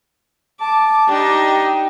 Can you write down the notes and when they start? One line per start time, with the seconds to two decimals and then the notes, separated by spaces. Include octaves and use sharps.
0.61 A5 D6
1.09 D4 D#4 G4